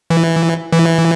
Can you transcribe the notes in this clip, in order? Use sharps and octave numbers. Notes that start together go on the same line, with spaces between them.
E3
E3